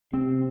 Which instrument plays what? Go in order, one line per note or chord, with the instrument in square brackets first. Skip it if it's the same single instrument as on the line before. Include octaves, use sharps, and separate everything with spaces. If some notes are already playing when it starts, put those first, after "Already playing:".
[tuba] C3 [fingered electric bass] C4